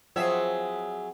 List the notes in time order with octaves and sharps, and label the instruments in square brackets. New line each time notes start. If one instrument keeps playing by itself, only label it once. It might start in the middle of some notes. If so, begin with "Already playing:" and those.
[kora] F3 C4 [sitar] F#3 G#4 E5